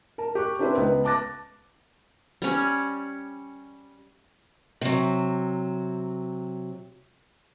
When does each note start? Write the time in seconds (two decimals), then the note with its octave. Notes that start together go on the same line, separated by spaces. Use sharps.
0.18 A#4 A5
0.35 G4 C#6 F#6
0.59 C4 D4 E4 G4 B4 C5
0.77 C#2 B3
1.05 A5 D6 F#6 A6 A#6
2.42 G3 C#4
4.81 C3 F#3